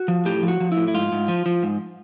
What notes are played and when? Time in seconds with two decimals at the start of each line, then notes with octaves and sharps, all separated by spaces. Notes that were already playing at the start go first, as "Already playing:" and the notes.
Already playing: F#4
0.08 F3
0.25 A2 G4
0.43 F3
0.48 F#4
0.60 F3
0.72 E4
0.77 A2
0.88 E4
0.94 G#2 F4
1.12 G#2
1.28 F3
1.46 F3
1.63 G#2